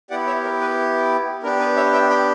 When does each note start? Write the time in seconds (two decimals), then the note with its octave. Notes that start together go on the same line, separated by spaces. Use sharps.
0.10 B3 E4 G4 D5 F#5
0.27 C#5 E5
0.45 A#4
0.61 B4
1.43 B3 D4 G4 A#4
1.60 B4
1.76 C#5 E5
1.93 E5 G5
2.10 G5 B5